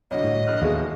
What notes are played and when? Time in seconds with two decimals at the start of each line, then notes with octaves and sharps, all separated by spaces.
0.11 C2 D3 F#3 C#5 D#5
0.24 A2
0.47 A#1 F6 F#6
0.62 A1 D#2 B2 G#3 G#4 A4 F5